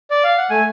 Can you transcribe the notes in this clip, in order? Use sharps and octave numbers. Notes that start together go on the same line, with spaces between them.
D5
F5
F#5
A3 G#5